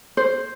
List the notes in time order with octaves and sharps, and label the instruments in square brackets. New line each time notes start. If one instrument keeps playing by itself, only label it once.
[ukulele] C5